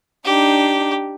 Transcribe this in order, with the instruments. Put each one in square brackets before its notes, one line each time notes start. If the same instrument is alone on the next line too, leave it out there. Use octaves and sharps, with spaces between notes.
[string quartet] D4 D#4 [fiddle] G4